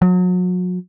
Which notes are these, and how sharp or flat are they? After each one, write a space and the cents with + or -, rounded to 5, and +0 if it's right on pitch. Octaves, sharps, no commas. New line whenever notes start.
F#3 -35